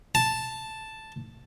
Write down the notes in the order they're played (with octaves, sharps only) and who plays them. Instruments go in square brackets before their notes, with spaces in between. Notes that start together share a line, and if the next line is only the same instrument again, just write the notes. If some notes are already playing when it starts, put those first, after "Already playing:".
[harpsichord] A5